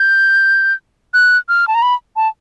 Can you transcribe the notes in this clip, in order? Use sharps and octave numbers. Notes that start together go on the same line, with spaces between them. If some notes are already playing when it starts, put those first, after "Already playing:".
Already playing: G6
F#6
F6
A5
A#5
B5
A5